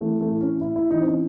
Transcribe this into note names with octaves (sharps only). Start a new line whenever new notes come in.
E3 A3
A3
A2
C#4
A2 E4
E4
E3 D#4
C4
C#4